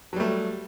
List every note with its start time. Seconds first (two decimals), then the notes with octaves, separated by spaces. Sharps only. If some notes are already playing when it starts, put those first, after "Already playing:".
0.13 F#3
0.16 G3
0.20 A3